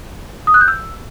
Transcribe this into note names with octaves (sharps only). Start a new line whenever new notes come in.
D#6
F#6
G6
E6